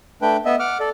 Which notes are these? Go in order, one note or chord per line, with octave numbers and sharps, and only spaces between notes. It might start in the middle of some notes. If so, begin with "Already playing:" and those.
A3 D4 B4 G5
B3 D#5 E5
F#5 D6 F6
A4 D5